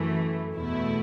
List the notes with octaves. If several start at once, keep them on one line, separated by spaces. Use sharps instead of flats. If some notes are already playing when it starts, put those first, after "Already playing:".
Already playing: F#2 E3 A3
E2 B2 A3 E4